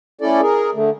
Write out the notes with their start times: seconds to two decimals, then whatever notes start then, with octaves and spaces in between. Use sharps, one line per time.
0.21 A3 C#4 E4 A4 D5
0.41 G#4 A#4
0.74 D3 A3